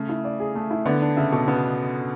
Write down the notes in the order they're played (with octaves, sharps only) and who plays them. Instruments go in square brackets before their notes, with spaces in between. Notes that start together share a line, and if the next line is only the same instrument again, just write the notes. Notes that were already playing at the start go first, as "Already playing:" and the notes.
Already playing: [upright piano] C#3 [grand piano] A3
[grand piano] E4
D5
G#4
A3
E4
[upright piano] D3 [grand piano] B3
[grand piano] D4
[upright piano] C#3 [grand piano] E5
[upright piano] B2 [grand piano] A4
[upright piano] C#3 [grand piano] B3